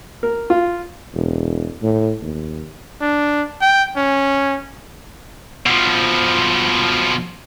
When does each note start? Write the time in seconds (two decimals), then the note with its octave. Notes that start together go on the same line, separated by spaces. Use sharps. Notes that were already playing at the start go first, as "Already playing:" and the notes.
0.23 A#4
0.50 F4
1.14 E1
1.82 A2
2.22 D#2
3.01 D4
3.61 G5
3.97 C#4
5.66 B2 F3